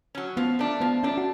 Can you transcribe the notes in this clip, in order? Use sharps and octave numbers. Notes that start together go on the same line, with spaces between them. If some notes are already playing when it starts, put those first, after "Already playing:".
F#3 C#4
F3 B3
A3 D4
F3 B3
A3 C#4 D4
F#4